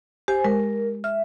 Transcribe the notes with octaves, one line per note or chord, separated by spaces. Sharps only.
G4 C5 G#5
G#3 A#4
E5 F6